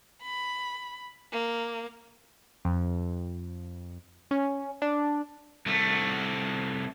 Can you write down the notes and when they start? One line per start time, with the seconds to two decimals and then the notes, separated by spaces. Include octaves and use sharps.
0.22 B5
1.32 A#3
2.65 F2
4.31 C#4
4.82 D4
5.66 C2 A3